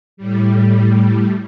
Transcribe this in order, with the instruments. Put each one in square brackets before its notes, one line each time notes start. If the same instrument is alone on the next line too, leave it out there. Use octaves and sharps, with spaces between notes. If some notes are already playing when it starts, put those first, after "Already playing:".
[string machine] A2 G3